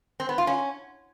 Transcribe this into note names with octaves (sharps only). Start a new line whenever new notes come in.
C4
B3
F4
C#4